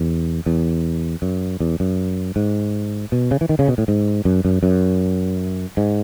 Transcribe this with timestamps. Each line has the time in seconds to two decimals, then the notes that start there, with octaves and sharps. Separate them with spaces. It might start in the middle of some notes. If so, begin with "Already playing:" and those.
Already playing: E2
0.46 E2
1.22 F#2
1.60 E2
1.80 F#2
2.36 G#2
3.12 B2
3.31 C#3
3.41 E3
3.49 D#3
3.59 C#3
3.68 B2
3.78 A2
3.88 G#2
4.25 F#2
4.45 F#2
4.63 F#2
5.77 G#2